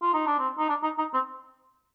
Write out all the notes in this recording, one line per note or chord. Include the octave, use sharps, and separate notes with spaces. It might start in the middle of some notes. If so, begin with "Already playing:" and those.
F4
D#4
D4
C4
D#4
D4
D#4
D#4
C4